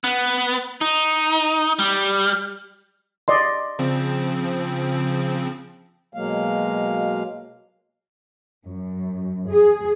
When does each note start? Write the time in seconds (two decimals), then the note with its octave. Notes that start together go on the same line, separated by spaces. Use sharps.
0.04 B3
0.81 D#4
1.79 G3
3.28 D5 D#5 C6
3.79 C#3 F3 C4
6.14 B2 F#3 G#3 A#3 F5
8.68 F#2
9.48 G#4